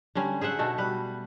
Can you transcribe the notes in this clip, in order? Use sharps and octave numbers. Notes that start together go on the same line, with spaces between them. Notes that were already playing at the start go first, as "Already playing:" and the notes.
D3 G3 C#4
G#4 C5 E5 F#5
B2 A3 D#4 F#4
G3 B4